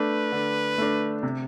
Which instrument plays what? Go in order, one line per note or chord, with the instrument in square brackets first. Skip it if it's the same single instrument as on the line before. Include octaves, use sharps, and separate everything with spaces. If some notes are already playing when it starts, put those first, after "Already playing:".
Already playing: [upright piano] A3 D4 [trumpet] B4
[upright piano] D3
A3 D4
C3